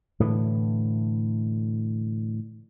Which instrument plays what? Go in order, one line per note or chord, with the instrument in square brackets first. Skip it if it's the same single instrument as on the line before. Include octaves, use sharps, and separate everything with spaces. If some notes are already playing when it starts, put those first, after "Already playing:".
[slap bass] A2 D3 E3